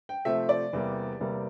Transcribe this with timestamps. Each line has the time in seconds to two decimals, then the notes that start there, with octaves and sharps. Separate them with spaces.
0.09 G5
0.25 C3 F3 A3 C4 E5
0.49 D5
0.73 E2 C3 G3 A#3
1.20 E2 C3 G3 A#3